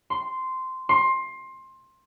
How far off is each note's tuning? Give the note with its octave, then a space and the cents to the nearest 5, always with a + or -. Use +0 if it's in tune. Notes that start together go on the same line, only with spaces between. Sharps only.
C6 -10
C6 +20